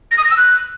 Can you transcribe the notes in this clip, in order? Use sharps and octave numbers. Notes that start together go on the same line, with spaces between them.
A#6
D#6
A#6
E6
F#6